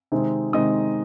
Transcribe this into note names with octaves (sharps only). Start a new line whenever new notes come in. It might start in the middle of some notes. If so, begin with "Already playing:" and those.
C3 D#3 G#3 C4 D#4
C3 D#3 G#3 C4 D#4 D#5 D#6